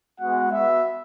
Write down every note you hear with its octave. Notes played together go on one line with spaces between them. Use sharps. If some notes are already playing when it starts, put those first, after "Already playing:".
G#3 B3 F#4 F#5
B3 F#4 E5